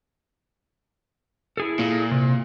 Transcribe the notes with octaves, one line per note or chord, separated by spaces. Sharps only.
E4 G#4 A4
A#2
C3